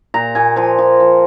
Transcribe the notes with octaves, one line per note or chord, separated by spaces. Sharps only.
A#2 A#5
A#2 G#5
F3 G#5
F3
F3